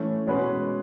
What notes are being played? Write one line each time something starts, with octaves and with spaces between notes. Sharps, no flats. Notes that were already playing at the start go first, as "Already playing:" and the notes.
Already playing: E3 A3 C#4
B2 G#3 C#4 G#4 B4